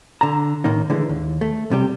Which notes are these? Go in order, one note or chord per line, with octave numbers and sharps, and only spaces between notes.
D3 A5 A#5
A2 D#3 A#3 D#4
D3 E3 G#3 A3
D#2
A3
B1 C3 G3 G4